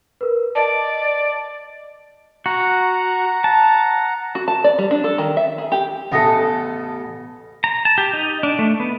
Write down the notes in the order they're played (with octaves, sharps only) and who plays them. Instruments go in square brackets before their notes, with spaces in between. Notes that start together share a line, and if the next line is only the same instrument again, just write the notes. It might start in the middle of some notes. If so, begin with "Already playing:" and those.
[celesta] A#4 B4
[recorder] D5 [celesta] D#5 A5
[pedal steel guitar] F#4 [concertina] F#5 A#5
[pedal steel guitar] A5
[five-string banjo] F#4
A5
D5
G3
D4
A4
D#3
E5
G#4
G4
[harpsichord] A1 B3 D#5 [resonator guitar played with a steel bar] C#3 A4
[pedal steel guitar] A#5
A5
G4
D#4
D4
A3
B3